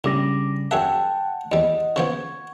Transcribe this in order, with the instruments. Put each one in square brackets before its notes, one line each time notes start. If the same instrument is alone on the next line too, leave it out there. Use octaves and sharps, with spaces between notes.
[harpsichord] A2 [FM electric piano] C#3 G3 [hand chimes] D4 D6 A#6
[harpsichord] F#2 G#4 E5 [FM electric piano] F#5 [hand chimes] G5 A5
[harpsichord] E2 G3 [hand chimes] D#5
[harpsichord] C#3 F3 B3 [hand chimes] C#6 G#6